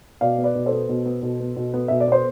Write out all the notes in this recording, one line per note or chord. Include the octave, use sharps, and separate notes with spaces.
B2 D5 F5
B3
B4 D5
B2
A4 C5
B3
B2
B3
B2
B3
B2
B3
B2 E5
D5
B3 C5